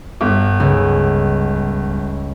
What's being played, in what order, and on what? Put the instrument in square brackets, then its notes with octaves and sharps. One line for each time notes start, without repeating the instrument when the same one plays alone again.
[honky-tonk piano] G1
[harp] C#2